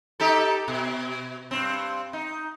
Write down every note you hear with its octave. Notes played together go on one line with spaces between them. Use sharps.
D#4 G4 A4
B2
G2 C4
D#4